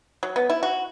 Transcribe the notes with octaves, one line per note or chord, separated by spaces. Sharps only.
F#3
B3
E4
F#4